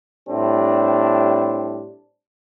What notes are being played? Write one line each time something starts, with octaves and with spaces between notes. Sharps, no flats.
A2 G3 C4 D4